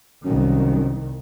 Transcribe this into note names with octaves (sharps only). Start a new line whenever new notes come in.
C2 F#2 D#3